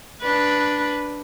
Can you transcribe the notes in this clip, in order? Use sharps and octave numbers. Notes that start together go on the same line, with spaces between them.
D4 B4